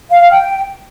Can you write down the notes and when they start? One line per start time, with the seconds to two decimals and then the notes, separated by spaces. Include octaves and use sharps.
0.10 F5
0.20 F5
0.31 G5